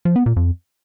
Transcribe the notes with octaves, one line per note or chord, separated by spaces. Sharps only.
F3
B3
A#2
F2